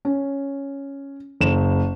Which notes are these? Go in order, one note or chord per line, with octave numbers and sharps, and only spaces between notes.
C#4
F#1 E7